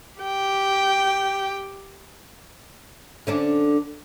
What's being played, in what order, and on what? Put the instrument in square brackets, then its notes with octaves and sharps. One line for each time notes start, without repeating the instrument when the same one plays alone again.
[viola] G4 G5
[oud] D3 C#4 D4